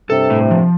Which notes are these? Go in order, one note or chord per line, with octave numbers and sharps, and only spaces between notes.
G2 C3 A4
A2
F3